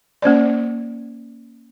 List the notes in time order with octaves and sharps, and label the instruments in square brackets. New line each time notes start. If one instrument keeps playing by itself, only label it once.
[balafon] A#3 C#4 C5 D5